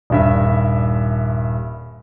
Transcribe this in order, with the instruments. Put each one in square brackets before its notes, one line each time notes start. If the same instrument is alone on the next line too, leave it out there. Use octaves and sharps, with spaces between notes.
[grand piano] D#1 G2 E5